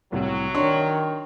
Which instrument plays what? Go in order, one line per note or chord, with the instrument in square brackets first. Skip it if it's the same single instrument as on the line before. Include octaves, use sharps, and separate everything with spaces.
[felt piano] C2 A2 C3 [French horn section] F#3
[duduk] D#3 [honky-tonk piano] D4 C#5 [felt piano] C6 C#6